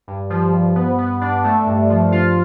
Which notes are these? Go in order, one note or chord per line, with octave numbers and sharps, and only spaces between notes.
G2
F3
G2
B3
B3
D4
A3
G2
F3
F4